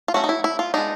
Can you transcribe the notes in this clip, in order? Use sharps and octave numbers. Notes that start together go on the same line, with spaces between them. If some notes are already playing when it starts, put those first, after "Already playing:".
F4
F#3 A3 C#4 F#4
D#4
E4
E4
F4
G#3 B3 D4 D#4